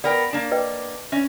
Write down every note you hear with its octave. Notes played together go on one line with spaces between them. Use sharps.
B3 A#4 D5 G5
A#3 D4
B4 D#5 G5
C#4 E5